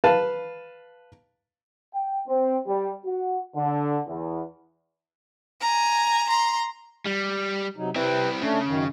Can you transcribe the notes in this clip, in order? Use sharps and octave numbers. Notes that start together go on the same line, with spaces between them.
B4 F5 A5
G5
C4
G3
F#4
D3
E2
G#5 A#5
A#5 C6
G3
C3 F#3 D#4
C3 C4 E4 B4 G5
C#3 A3 D4
F#2 D#3